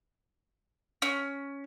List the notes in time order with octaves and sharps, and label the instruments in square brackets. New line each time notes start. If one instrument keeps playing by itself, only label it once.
[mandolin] C#4